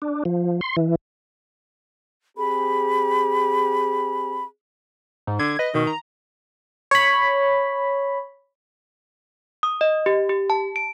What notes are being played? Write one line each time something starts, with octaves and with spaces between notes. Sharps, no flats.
D4
F3
C6
E3
C4 G4 G#4 B5
G#2
D3 G#6
B4 D#5
B2 D#3
A#5
C#5 B5
D#6
D#5
G4
G4
A5
D7